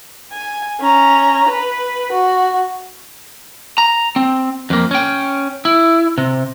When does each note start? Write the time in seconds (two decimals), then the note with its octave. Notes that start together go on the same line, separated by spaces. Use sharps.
0.32 G#5
0.80 C#4 A#5
1.49 B4
2.12 F#4
3.78 A#5
4.16 C4
4.70 F2 A#3
4.91 C#4 G5
5.65 E4
6.18 C3